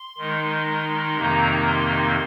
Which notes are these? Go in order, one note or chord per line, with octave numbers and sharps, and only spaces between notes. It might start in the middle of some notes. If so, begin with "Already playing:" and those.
Already playing: C6
D#3 G#3 D#4
F2 C3 D#3 A#3 D#4 A#5
C6